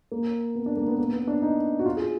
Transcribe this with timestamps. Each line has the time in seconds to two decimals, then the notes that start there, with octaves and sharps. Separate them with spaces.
0.12 A#3
0.55 B3
0.66 D4
0.77 A#3
0.88 B3
0.99 A#3
1.13 B3
1.28 D4
1.42 D#4
1.79 F#4
1.86 F4
1.97 G#4